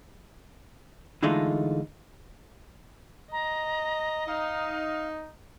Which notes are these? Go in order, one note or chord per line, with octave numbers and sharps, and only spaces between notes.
D3 E3 G#3 A3 D#4 F4
D#5 A#5
D#4 F5